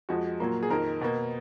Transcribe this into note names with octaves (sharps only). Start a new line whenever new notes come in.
F2 F3 G#3 F#4
A#2 F#3 A#3
G#4
F2 D#3 A#3 A#4
B2 A#3